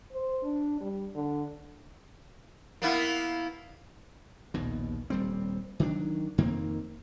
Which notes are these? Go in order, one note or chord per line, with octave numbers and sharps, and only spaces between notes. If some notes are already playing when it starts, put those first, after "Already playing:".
C5
D4
G3
D3
A#3 B3 E4
A#1 D#2 B2
D#1 G3 C4
D#3 F#3 D4
F2 D#3 A#3 C4